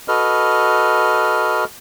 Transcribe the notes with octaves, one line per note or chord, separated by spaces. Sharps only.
F#4 A4 B4 D#5 F6